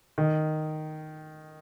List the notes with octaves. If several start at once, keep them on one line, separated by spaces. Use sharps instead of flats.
D#3